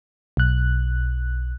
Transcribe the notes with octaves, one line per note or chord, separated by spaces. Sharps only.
B1 F#6